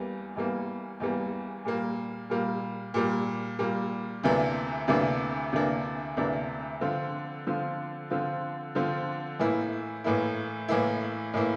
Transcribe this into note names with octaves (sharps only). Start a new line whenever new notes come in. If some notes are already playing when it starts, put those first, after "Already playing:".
Already playing: E2 E3 G3 A#3
E2 E3 G3 A#3
E2 E3 G3 A#3
A#2 G3 A#3
A#2 G3 A#3
A#2 G3 A#3
A#2 G3 A#3
D2 C3 E3 A#3 D4
D2 C3 E3 A#3 D4
D2 C3 E3 A#3 D4
D2 C3 E3 A#3 D4
D3 F3 C4 F4
D3 F3 C4 F4
D3 F3 C4 F4
D3 F3 C4 F4
A2 E3 A#3 E4
A2 E3 A#3 E4
A2 E3 A#3 E4
A2 E3 A#3 E4